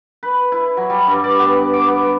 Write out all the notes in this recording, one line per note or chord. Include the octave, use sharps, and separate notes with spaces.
B4
E4
F#3
G3
G2
D5
B3
D6
B3